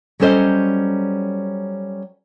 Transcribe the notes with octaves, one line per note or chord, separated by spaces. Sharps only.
F#3 G3 C#4 A4 C5 D#5